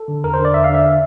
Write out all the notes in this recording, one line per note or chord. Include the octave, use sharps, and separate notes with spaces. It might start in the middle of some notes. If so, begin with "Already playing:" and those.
Already playing: A4
D3
E2 A#4
C5
D3
D5
E2 E5
F5
D3 E5